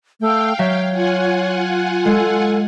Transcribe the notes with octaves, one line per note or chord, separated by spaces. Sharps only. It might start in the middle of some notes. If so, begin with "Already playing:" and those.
A3 F5 G5
F#3 C#5 E5
F4 F#5 G#5
G#3 A4